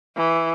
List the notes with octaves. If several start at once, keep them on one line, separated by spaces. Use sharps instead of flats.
E3